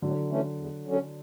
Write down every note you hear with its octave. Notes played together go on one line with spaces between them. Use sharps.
A2 D3 F#3
E3 A3 C#4
E2
D3 F#3 C#4